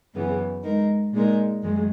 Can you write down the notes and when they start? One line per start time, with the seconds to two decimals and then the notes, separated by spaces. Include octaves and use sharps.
0.14 F#2 C#3 E3 B3
0.63 G#3 D#4 A#4
1.13 A#2 G#3 D#4 A#4
1.63 F#2 D#3 G#3